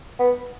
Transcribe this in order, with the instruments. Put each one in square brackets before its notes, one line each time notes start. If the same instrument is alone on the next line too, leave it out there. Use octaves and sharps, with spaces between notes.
[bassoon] B3